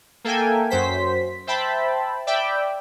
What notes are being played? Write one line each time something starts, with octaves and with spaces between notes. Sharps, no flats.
A#3 A4 A#4 E5 G5 G#5
F#2 F#3 C5 B6
C5 E5 G5 A5 B5
D5 E5 G5 B5